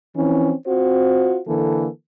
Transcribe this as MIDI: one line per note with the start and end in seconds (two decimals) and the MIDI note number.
0.17 0.52 52
0.17 0.52 53
0.17 0.52 60
0.17 0.52 61
0.66 1.39 60
0.66 1.39 65
0.66 1.39 66
0.66 1.39 72
1.47 1.87 50
1.47 1.87 52
1.47 1.87 58
1.47 1.87 69